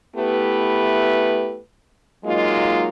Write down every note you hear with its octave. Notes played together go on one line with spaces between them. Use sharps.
A3 B3 E4 G4 B4
F#3 G#3 A#3 D#4 F4